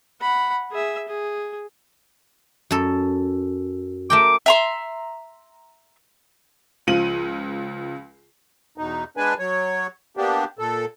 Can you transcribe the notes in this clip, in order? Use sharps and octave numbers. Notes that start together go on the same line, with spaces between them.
F#5 B5
G#4 E5
G#4
F#2 A4
A3 A#4 G5 D6
E5 A#5 C6
C#2 F3 F4 D#7 F#7
E2 B2 D#4
G#3 B3 D4 B4 G#5
F#3 C#5
A#3 B3 D4 G4
A#2 A4